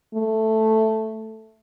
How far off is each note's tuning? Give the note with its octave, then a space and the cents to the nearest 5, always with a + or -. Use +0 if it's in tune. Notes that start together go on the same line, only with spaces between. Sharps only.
A3 +0